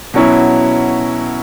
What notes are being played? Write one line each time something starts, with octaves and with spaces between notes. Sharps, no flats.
B2 F#3 C#4 E4